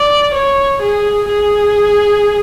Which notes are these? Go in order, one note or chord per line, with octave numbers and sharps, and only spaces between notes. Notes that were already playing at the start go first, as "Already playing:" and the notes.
Already playing: D5
C#5
G#4
G#4